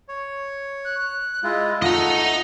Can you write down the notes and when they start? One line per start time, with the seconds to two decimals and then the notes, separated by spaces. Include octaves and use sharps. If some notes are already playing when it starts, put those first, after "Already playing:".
0.08 C#5
0.85 F#6
1.43 G#3 E4 F4 D#5
1.82 A3 F4 D#5 F#5 A#5